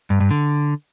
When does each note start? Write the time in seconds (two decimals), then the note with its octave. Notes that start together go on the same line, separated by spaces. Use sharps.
0.10 G2
0.20 G2
0.31 D3